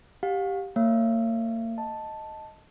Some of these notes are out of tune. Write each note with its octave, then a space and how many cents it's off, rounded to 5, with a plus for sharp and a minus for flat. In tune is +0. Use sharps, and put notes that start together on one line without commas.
G4 +0 F5 +35
A#3 -35 C#5 +0 F5 -45
D#5 +5 A5 +0